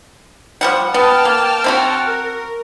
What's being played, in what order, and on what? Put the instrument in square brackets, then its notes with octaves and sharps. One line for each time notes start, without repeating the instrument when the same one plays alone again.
[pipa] F3 G3 F#5
[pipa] B3 [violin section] G5 A5 F6
[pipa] A#3
C4 E4 F#4
[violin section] A#4